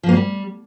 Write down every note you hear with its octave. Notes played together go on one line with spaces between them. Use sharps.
F3
A#3
G3